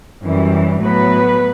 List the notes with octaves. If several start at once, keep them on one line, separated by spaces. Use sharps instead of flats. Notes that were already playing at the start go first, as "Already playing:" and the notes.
F#2 E3 G3
A2 F#3 B3 B4